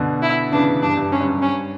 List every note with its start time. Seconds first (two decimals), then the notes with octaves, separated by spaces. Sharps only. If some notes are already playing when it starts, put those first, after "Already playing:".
Already playing: B2 D3
0.22 E4
0.52 C#3 E3 D4
0.82 G2 D4
0.97 G2
1.12 G2 C#4
1.20 F#2
1.29 G2
1.42 C#4